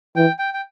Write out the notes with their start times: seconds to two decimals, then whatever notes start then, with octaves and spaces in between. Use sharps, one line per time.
0.16 E3 G5
0.39 G5
0.54 G5